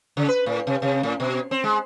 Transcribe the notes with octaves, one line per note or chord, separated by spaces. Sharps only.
C#3
B4
A2
C3
C3
A2
B2
C4
G#3